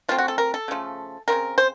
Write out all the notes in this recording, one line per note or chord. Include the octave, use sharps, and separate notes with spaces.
F3 A3 C4 F4
F#4
A4
A#4
A4
C#3 F3 A3
C#3 F3 C4 A#4
C5